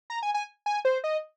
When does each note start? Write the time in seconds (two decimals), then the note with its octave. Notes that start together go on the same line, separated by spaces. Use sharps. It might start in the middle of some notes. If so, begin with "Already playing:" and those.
0.10 A#5
0.23 G#5
0.34 G#5
0.66 G#5
0.85 C5
1.04 D#5